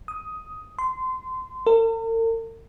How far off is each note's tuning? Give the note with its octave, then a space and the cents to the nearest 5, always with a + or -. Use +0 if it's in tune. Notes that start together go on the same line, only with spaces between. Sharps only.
D#6 +10
C6 -25
A#4 -45